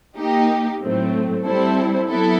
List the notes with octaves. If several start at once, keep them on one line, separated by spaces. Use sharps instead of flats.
A#3 D#4 G4
A2 F#3 A3 C4
G3 C4 E4 A4 C5
F#3 B3 E4 A4